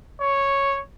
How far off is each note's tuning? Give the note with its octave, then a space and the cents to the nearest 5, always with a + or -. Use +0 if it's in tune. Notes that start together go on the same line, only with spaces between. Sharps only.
C#5 -5